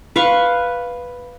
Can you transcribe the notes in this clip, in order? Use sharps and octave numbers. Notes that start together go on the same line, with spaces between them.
B4 F5 C6 C#6